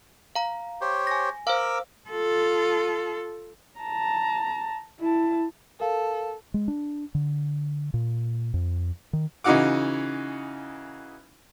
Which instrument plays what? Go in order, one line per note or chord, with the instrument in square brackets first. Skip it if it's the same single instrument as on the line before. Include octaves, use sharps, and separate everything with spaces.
[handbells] F5 A#5
[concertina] G4 C5 C#5
[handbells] G#5 A#6
[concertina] A#4 D6 E6 [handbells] C5 F5
[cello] F4 A4
[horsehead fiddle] A5 A#5
E4 A5
[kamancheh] A4 [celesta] A#4 F5
[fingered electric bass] G#3
D4
D3
A#2
F2
D#3
[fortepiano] C#3 E3 D#4 F#4 F#5 D6